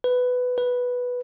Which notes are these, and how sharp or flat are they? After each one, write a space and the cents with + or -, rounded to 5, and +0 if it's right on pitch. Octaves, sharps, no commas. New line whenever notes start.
B4 +10
B4 -5